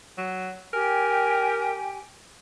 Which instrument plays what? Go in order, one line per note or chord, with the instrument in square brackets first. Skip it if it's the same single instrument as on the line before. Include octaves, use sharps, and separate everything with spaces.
[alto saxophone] F#3
[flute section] G4 G5 G#5 [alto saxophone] A#4